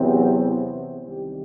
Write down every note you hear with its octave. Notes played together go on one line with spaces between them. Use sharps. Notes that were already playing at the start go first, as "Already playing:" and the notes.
Already playing: E2 C3 F#3 C4
F#4
C2 C3 D#3 G3 G4